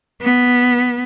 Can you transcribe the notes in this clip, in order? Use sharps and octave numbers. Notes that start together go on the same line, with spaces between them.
B3